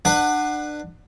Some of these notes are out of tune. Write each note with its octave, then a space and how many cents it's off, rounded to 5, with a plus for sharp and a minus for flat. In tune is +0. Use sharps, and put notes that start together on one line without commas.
D4 +30 B4 +0 F#5 +0